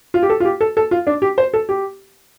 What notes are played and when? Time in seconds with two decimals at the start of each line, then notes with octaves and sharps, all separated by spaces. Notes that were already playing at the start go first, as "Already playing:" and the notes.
0.14 F4
0.23 G4
0.30 A4
0.40 F4
0.45 G4
0.61 A4
0.77 A4
0.91 F4
1.07 D4
1.22 G4
1.38 C5
1.54 A4
1.69 G4